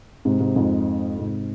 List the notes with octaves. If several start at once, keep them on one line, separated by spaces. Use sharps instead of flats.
G#2 C3
G#2 C3
F2 G#2
G#2 C3